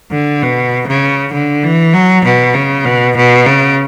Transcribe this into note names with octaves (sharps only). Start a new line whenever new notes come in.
D3
B2
C#3
D3
E3
F#3
B2
C#3
B2
B2
C#3